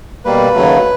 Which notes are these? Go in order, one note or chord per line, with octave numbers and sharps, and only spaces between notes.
B2 G3 A#3 B4
D#2 C#3 F#3 A3